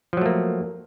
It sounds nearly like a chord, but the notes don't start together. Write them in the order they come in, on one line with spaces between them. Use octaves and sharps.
F3 F#3 A3 A#3